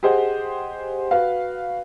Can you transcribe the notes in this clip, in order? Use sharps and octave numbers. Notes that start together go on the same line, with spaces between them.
G4 G#4 C5 D#5 F#5
F#4 B4 F5